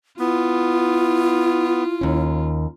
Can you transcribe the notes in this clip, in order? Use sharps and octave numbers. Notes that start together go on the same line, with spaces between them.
B3 E4 F4
D#2 C#4